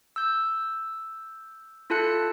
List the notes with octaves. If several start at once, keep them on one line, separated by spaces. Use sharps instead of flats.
E6 G6
E4 F4 A4 A5 F#6 C#7